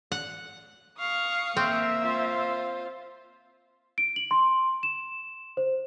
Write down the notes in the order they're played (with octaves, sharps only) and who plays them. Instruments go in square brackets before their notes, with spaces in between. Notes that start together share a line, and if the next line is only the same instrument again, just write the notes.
[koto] F#5
[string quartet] F5 C#6 D#6
[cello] A#3 E5 [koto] C4
[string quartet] F4 C5
[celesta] D7
F#7
C6
E7
C5